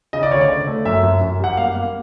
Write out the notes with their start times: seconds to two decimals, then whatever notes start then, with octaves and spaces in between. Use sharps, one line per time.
0.13 C#3 D#5
0.23 D5
0.31 D2 C#5
0.41 D5
0.49 C#3
0.67 A3
0.85 F#2 E5
1.03 F#2
1.22 F#2
1.39 G3 F#5
1.57 A#3 F5
1.75 A#3 F5